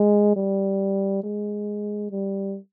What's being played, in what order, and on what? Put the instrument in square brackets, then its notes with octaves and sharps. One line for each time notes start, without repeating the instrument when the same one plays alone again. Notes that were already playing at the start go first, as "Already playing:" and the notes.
Already playing: [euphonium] G#3
G3
G#3
G3